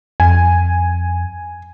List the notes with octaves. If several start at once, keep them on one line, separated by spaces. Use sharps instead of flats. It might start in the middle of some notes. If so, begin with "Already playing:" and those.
F2 G#5